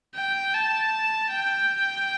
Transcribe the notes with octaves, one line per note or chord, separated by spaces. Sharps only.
G5
A5
G5